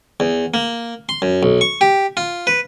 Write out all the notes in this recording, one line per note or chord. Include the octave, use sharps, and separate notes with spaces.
E2
A#3
C6
F#2
B1
C#6
G4
F4
B4